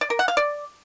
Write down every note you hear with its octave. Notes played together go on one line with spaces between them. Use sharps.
D5
A#4
F#5
F5
D5